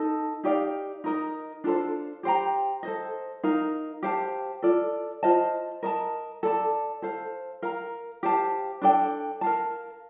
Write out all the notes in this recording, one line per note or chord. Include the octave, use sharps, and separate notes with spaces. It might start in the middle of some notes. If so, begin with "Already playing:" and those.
Already playing: D#4 A4 D#5 A5
D#4 G4 D5 F5
D#4 A#4 D#5
D4 F4 A4 C5
G4 C5 G5 A#5
A4 C5 D#5
D#4 A#4 F5
G4 C5 F5 A5
F4 A4 D5
F4 C5 D#5 A5
A#4 D#5 A5
A4 D5 A5
A4 C5 F5
A#4 F5 A#5
G4 C5 F5 A5
D4 A4 D5 G5
A#4 F5 A5